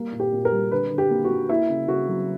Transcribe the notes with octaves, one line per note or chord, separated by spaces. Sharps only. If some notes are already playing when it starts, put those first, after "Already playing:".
Already playing: G3 A#3
A#2
G4
A#2
A#4
G3
D3 B4
D3
G4
A#3
F#4
A#3
A#3 E4
C#3
C#3 F#4
F#3